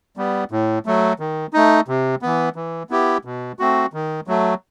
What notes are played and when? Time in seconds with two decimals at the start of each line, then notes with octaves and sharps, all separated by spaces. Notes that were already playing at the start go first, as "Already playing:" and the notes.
0.17 G3 B3
0.51 A2
0.86 F#3 A3
1.20 D#3
1.53 A3 D#4
1.88 C3
2.22 E3 B3
2.56 E3
2.90 B3 E4 G4
3.25 B2
3.59 A3 C4 F#4
3.93 D#3
4.27 F#3 A3